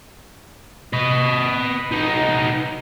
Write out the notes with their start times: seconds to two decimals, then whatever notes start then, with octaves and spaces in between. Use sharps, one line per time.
0.93 B4 D#5
1.92 B3 D#4